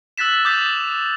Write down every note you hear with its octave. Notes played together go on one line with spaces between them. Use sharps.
E6 F#6 A6 B6 E7
D6 D#6 G6 A6 B6